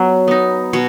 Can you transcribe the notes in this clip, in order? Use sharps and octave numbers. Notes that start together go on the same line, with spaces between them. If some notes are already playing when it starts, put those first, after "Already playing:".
Already playing: F#3 B3
B3 D#4
B2 C#5